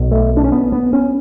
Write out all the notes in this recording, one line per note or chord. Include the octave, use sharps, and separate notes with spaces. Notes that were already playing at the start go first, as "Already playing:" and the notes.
Already playing: B1 B2
A3
D4
C#4
B3
B3
C#4